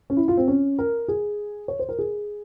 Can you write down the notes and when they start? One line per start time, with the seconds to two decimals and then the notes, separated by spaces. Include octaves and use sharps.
0.10 C#4
0.17 E4
0.28 F4
0.37 C4
0.48 C#4
0.79 A#4
1.08 G#4
1.68 C#5
1.79 C5
1.89 A#4
1.99 G#4